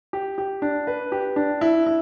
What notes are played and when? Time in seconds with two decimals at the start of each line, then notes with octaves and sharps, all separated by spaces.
0.13 G4
0.38 G4
0.62 D4
0.87 B4
1.12 G4
1.36 D4
1.61 E4
1.87 E4